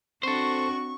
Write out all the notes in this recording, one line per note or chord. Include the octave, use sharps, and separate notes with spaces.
C4 D4 F#4 A4 C5 C#6